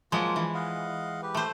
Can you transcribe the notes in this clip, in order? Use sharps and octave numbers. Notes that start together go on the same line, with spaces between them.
F3 F#3 G#3 A#3 F4
E3
D#5 F5 F#5
G4 B4
A3 C5